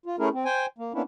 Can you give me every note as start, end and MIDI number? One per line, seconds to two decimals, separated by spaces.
0.06 0.16 65
0.19 0.29 57
0.19 0.29 61
0.19 0.29 64
0.19 0.29 68
0.19 0.29 70
0.33 0.44 60
0.45 0.66 72
0.45 0.66 79
0.45 0.66 80
0.78 0.93 58
0.94 1.02 58
0.94 1.02 59
0.94 1.02 61
0.94 1.02 62
0.94 1.02 64